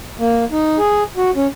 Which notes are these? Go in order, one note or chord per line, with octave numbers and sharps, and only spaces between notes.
A#3
D#4
G#4
F#4
C#4